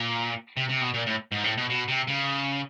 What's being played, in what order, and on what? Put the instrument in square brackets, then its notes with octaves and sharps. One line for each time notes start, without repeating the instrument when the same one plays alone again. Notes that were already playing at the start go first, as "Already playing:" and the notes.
Already playing: [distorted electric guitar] A#2
C3
C3
B2
A#2
A2
G#2
A2
B2
B2
C3
C#3